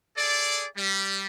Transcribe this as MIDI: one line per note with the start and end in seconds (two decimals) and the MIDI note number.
0.16 0.64 68
0.16 0.64 69
0.16 0.64 74
0.76 1.27 55